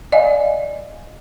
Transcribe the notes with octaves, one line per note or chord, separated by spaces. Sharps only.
D5 D#5 F5 G#5